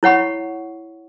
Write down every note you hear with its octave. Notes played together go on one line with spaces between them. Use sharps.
E4 C#5 F#5 B5 C#6